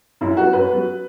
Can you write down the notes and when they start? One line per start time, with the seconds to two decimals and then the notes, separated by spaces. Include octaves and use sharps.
0.21 F#2 E4
0.37 F#3 B3 F#4
0.53 F#2 B4
0.69 F#3 B3